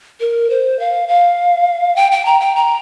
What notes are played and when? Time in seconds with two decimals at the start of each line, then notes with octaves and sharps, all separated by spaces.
0.20 A#4
0.50 C5
0.80 F5
1.08 F5
1.96 G5
2.12 G5
2.25 A#5
2.40 G5
2.56 A#5